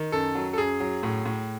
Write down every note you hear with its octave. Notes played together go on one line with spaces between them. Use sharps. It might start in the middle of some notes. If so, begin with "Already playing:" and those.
Already playing: D#3
F#2 A4
F#3
A4
F#2 G#4
F#3
A2
A2